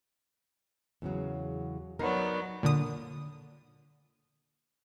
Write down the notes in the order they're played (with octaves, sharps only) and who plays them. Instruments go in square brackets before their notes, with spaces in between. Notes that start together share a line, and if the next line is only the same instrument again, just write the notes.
[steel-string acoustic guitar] E2 C#3 F#3
[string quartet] F#3 B3 D5 [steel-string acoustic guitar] D#4 A#4
[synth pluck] A#2 D3 D#6